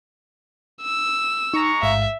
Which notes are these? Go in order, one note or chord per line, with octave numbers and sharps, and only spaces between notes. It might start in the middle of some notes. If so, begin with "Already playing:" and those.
E6
G#3 D#4 A#5 C#6
A1 G#2 E5 F5